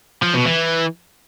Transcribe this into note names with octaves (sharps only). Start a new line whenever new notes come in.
F3
B2
E3